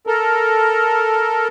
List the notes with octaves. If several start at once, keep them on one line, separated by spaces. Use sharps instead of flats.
A4 A#4